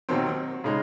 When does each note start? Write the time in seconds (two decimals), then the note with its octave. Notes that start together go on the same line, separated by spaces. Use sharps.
0.09 D#2 D#3 F#3 C4
0.64 C#3 G#3 D#4